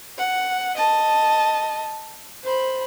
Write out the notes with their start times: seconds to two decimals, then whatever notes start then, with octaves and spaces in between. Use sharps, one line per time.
0.18 F#5
0.77 D#5 A5
2.44 C5 B5